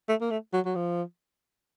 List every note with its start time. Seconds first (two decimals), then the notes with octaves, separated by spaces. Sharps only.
0.08 A3
0.21 A#3
0.30 A3
0.53 F#3
0.66 F#3
0.75 F3